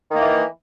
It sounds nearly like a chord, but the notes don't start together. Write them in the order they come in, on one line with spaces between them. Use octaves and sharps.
D#3 A#3 E3